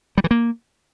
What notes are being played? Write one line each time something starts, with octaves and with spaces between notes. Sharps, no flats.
G3
E3
A#3